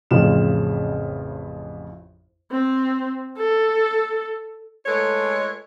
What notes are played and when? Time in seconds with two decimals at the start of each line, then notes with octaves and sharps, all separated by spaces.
0.11 A1 F2 A2 C#3 F4 E7
2.52 C4
3.38 A4
4.86 G#3 A3 F4 A4 B4 C#5